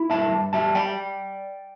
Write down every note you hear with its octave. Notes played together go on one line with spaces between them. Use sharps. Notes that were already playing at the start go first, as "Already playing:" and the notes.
Already playing: E4
G2 E5 A5
G2
G3 E5 A5
D5 G5